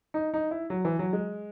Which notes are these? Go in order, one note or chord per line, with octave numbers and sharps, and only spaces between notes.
D#4
D#4
E4
F#3
E3
F#3
G#3